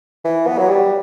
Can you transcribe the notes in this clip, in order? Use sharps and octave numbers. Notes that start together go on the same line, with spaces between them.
E3
B3
F#3
G3